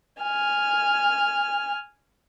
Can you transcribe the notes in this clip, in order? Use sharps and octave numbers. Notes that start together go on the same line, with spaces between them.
G#5 F6